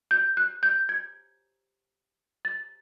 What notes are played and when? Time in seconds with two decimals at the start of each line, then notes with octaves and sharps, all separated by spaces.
0.11 G6
0.37 F#6
0.63 G6
0.89 G#6
2.45 A6